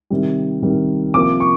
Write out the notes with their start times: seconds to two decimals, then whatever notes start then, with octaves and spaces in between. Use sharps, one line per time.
0.10 C3 D#3 G3
0.62 C3 D#3 G3
1.14 C3 F3 A#3 D6
1.40 C#6